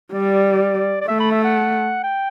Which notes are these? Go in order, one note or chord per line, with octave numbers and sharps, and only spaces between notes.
G3 D5
D5
A3 E5
B5
E5
F#5
G5